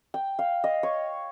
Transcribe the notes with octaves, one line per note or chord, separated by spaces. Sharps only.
G5
F5
D#5
C#5